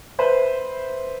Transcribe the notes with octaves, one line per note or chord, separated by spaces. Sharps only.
B4 C5 E5